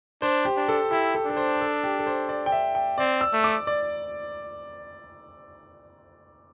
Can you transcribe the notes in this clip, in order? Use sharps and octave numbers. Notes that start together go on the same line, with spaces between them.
D4 C5
G4
D4
A4
E4 G4
A4
D4 A4
C5
A4
G4
A4
C5
D5
G5
E5
G5
C4 D5
E6
A3
D6
D5